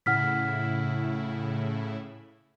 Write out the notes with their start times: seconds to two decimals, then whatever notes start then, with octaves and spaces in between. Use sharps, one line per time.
0.06 A2 C#3 E4 F#5 F6 B6